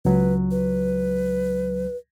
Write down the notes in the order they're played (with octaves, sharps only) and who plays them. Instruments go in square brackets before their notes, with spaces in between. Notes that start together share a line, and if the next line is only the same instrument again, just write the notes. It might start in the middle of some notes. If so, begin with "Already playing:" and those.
[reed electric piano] C#2 F#3 [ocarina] B4
[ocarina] B4